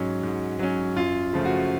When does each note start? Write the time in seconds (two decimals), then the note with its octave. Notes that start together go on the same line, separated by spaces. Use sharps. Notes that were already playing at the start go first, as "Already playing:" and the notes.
Already playing: G#2 F#3 C#4
0.23 G#2
0.59 F#3 C#4
0.96 F#2 F4
1.33 C#3 F3 A3
1.45 F#4